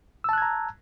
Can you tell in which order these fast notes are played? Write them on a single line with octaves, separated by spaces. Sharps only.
E6 A5 F#6 G#6 A#5